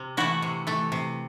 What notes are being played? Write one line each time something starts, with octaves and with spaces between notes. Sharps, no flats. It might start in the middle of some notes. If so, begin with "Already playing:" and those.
Already playing: C3
E3 A3 E4 F#4
C3
E3 A3
C3